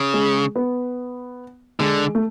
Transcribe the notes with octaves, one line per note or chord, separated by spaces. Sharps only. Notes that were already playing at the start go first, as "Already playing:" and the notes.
Already playing: C#3
G#3
B3
D3 G#3
A3